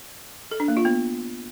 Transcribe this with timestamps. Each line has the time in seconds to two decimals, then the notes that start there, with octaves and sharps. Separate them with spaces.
0.51 A4
0.60 D4
0.68 A#3
0.77 F4
0.85 B3